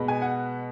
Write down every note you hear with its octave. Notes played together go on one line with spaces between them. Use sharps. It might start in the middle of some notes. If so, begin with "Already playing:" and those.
Already playing: B2 G#3 B3
G#5
F#5